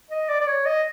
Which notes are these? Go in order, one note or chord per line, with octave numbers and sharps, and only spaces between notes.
D#5
D5
D5
C#5
D#5